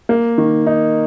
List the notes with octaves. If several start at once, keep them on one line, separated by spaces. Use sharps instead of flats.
A#3
D#3
D#4